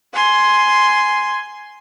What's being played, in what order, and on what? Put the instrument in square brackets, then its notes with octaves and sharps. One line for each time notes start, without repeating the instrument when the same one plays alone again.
[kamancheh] G#5 C6